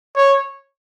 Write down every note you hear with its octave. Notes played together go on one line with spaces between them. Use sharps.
C#5